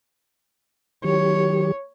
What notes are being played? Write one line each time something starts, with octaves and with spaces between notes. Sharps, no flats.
D#3 F#3 G4 C#5